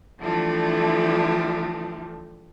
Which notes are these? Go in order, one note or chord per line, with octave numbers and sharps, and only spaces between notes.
D3 E3 F3 G3 A3